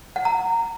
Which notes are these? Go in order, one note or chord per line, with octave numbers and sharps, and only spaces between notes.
F#5
A#5